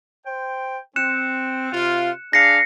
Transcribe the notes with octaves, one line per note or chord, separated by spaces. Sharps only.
C5 G5
C4 F#6 C#7 E7
C3 F4
D4 G#4 F5 A#6 C7 C#7